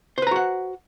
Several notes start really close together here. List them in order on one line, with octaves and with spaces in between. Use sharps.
C5 B4 A#5 F#4 F#5